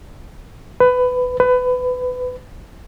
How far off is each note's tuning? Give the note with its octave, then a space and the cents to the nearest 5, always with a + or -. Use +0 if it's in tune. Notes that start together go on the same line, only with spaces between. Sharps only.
B4 +20
B4 +25